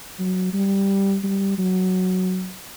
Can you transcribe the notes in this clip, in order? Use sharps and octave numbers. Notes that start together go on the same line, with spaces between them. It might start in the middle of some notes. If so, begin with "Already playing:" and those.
F#3
G3
G3
F#3